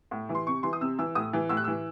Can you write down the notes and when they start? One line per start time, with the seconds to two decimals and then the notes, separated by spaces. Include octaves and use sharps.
0.11 A2
0.29 E3
0.35 C6
0.47 C3 C#6
0.63 E3 C6
0.73 D#6
0.81 C3 E6
0.99 E3 E6
1.15 A2 D#6
1.33 E3
1.49 A2 E6
1.57 F#6
1.64 E3 E6